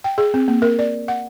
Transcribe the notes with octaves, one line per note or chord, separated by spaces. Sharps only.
G5
G#4
C4
A#3
A#4
D5
F#5